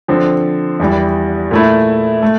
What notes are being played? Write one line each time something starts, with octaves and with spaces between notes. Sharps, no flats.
D3 F3 C4
E2 E3 G3
A#2 A3 E4
A3